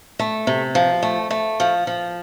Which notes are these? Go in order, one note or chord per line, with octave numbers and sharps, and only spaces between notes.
A3
C3
F3
A3
A3
F3
F3